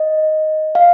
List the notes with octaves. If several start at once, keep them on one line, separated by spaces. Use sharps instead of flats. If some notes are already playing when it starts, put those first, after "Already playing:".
Already playing: D#5
F5